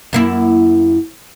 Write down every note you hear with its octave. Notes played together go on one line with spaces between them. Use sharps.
F#2 A#3 E4